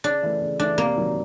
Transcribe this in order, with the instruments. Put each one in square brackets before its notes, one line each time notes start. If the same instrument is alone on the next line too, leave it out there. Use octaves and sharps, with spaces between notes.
[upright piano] C#3 [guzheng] D4
[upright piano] E3 A3
C#3
[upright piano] E3 A3 [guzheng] D4
[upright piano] C3 [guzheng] A#3
[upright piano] D#3 F#3